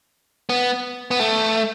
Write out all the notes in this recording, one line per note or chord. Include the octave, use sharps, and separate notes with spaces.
B3
B3
A3